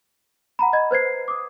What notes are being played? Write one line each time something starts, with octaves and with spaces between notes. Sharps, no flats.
F#5 A#5 B5
D#5 B5 G#6
B4 C5 G#6 C7
D6 D#6